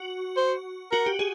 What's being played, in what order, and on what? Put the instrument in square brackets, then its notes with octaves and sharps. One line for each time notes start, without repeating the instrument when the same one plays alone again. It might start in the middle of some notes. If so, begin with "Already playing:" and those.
Already playing: [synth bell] F#4
[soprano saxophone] C5
[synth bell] F#4 [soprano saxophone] A#4
[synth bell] G4
G#4